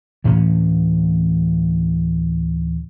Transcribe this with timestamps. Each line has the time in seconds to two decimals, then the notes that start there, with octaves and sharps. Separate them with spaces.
0.24 D2 A2 E3 C#4